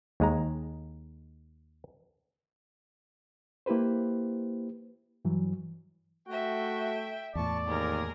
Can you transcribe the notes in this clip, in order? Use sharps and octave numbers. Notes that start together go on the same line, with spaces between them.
D#2 G#3 A#5
A#3 E4 G4 B4 C5
G2 E3 F#3
A3 F#4 E5 G5
E2 A2 D5 A5 C#6
D#2 G#4 A#4